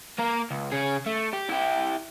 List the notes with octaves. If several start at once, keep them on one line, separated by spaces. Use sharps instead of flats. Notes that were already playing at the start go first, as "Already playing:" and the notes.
A#3 A#4
C#2
C#3 G#4
A3
G4
E4 G4